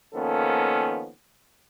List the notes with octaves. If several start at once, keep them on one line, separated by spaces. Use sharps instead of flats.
D#3 F3 A#3 B3 C#4 A4